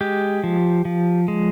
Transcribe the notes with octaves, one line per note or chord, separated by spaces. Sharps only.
G#3 G4
F3
F3
G#3